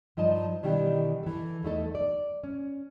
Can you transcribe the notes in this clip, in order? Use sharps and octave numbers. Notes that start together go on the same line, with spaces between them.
G2 F3 D#4 D#5 A5
B2 D#3 E3 G3 D4 G4
E3 A4
E2 A3 D#4 A4
D5
C#4